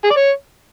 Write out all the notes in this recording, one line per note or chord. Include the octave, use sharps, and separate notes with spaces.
G#4
D5
C#5